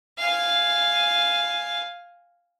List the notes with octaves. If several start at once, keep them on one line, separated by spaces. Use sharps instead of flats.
F5 G#5